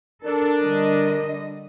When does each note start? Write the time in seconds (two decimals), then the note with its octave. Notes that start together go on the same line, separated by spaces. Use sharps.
0.25 D4 A4 A#4
0.62 D3 G3 D#5